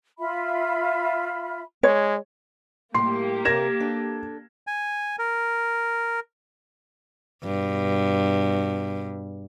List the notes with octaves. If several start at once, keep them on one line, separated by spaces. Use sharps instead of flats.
F4 E5 B5
G#3 C#5
A2 G3 A#3 G4 C6 C7
C3 A4 A#4 G#6 A#6 E7
D4 A4
G#5
A#4
G2 B2